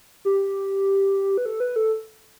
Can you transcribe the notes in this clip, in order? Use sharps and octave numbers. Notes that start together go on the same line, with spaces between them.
G4
B4
A4
B4
A4